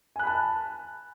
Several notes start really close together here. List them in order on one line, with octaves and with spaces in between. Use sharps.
G#5 F#6 B5 A5